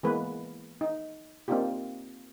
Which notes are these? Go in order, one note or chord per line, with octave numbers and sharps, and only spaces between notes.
E3 G#3 A#3 B3 B4
D#4
A#3 C4 D4 D#4 F4 G4